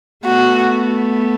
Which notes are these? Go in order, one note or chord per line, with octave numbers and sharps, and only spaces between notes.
A3 B3 F#4